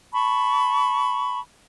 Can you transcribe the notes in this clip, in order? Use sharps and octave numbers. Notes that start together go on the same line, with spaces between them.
A5 B5 C#6